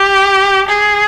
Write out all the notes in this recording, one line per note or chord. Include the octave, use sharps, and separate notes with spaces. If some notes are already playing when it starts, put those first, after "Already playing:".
Already playing: G4
G#4